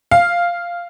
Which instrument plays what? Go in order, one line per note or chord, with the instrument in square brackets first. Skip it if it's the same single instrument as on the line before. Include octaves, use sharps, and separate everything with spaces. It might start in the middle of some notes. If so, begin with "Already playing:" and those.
[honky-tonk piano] F5